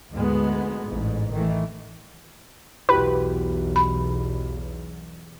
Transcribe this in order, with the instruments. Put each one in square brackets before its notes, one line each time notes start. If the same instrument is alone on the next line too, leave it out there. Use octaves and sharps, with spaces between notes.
[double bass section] D2 G#2 G#3 B3
A1 G#2
D#3 E3 A3
[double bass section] B1 E2 [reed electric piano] E4 F#4 G4 [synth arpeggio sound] B4
[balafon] B5